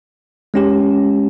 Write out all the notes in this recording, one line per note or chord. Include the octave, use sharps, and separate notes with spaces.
G#3 C#4 G4